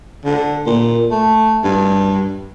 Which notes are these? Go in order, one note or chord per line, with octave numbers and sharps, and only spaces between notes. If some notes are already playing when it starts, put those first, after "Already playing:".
D3
A#2
A3
G2